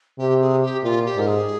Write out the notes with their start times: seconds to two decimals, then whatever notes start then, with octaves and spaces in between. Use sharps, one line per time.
0.19 C3 G4
0.41 G#4
0.62 G4
0.84 A#2 F4
1.06 G4
1.17 G#2 A#4
1.27 G#4